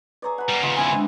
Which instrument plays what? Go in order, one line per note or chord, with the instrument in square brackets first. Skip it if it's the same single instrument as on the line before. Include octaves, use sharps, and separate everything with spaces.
[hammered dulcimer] G#4 C#5 D5 [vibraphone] B4 A#5
[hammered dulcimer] F#5 B5
[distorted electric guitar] G3 A#3
[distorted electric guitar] D#2 C#3 [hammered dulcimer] F4 G#4 D#5
[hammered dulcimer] C4 D4 E4 [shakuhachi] G#5
[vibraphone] G#3 D4 [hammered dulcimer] B3 D#5